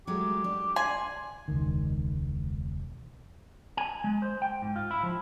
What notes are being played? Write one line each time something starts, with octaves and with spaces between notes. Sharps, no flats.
F#3 G#3 A3 G4
D4
G#5 C6
E1 C#2 D#3
G#5
G#3
C5
G5
G#2
F4
E4
F3